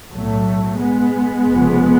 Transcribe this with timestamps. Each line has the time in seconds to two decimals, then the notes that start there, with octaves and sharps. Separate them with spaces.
0.12 B1 A2 F#3 A3
0.80 G#3 B3
1.48 F1 F2 C#3